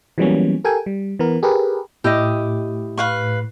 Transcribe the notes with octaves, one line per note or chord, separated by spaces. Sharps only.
E3 F#3 G3 A#3 B3 C#4
G4 A4 A#4 G5 G#5
G3
E3 B3 A#4
G4 G#4 A#4 B4
A2 E4 G4 D#5
B4 F5 C#6